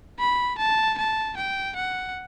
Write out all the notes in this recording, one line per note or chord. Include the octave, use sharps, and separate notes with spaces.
B5
A5
A5
G5
F#5